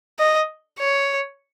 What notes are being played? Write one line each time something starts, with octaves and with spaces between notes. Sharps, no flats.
D#5
C#5